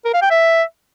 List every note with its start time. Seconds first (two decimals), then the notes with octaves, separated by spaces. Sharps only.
0.05 A#4
0.13 F5
0.22 G5
0.30 E5